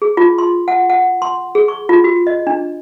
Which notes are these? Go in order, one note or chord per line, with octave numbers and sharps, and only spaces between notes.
G#4
F4
C6
F#5
F#5
C6
G#4
C#6
F4
F#4
D#5
D4